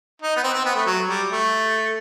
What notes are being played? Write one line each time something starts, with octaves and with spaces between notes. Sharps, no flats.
D#4
B3
C4
C4
B3
A3
F#3
G3
A3